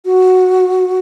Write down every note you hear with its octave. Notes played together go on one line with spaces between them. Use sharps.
F#4